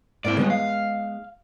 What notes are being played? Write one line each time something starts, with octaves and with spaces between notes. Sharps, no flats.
G#2 A#3 C4 E4 D5
D#3 G3 G#3 B3 D#4
F5